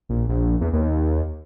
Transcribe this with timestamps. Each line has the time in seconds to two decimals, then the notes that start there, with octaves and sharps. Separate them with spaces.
0.09 A#1
0.29 A#1
0.61 E2
0.73 D#2